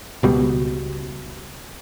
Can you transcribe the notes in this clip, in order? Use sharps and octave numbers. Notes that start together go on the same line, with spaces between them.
C#2 B2 G3